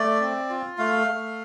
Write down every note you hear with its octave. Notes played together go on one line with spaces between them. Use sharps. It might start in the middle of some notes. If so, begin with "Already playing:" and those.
Already playing: A3 D5
C4
F4
A3 F5
A3